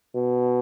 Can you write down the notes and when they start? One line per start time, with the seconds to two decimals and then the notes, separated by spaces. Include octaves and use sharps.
0.15 B2